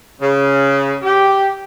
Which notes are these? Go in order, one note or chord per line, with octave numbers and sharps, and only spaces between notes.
C#3
G4